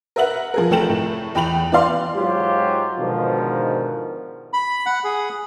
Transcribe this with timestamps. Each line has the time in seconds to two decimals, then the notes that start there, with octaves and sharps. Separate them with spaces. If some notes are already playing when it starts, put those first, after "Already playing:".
0.16 A#4 B4 E5 F#5 F#7
0.54 F3 G#4 A#4
0.71 F1 A3 G5 E7 F#7
0.89 A2
1.35 E2 G5 B5 F7 F#7
1.72 E3 B3 D5 F5 C6
2.15 G#2 F#3 F4 G4
2.98 G#2 B2 D3 D#3 F3
4.53 B5
4.86 F#5
5.04 G#4